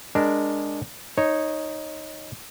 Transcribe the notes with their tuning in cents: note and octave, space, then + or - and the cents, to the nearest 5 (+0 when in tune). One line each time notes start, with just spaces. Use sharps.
G#3 -10 D4 +0 A#4 -5
D#4 +0 C#5 -15